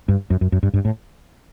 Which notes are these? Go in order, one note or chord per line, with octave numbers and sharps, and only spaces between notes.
G2
F#2
F#2
F#2
G2
G2
A2